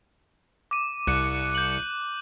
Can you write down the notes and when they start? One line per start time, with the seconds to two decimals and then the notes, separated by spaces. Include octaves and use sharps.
0.71 D6 D#7
1.07 C2 F#6 C#7
1.55 G6 F#7